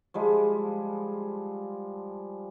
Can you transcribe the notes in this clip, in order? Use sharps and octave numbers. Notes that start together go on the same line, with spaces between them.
F3 G3 G#3